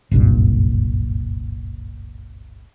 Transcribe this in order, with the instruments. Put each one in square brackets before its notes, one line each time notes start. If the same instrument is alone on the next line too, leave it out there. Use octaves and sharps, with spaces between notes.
[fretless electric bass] F#1 C2 G2 A#2